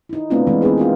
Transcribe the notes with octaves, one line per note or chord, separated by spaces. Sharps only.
D#4 E4
A3 B3 C4 D4 E4 F4
E3 G#3 C4
B3 C4 D#4 G#4 B4 C5
D#4 F4 A#4